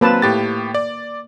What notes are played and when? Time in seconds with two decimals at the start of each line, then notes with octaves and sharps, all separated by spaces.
0.01 F#3 A#3 C4 B4 A5
0.22 A2 G4 A6
0.75 D5